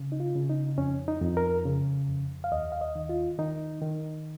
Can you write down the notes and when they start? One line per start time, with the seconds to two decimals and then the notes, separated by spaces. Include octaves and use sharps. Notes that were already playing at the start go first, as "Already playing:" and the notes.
Already playing: C#3
0.12 D#4
0.20 F4
0.35 C#3
0.50 D#4
0.78 F2 C#4
1.08 D#4
1.21 F2
1.37 A#4
1.66 C#3
2.08 F2
2.44 F5
2.51 D#2 D#5
2.72 F5
2.81 D#5
2.96 D#3
3.09 F4
3.39 D#3 D#4
3.82 D#3